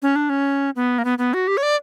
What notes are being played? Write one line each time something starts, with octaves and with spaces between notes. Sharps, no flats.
C#4
D4
C#4
B3
A#3
B3
B3
F#4
G4
C#5
D5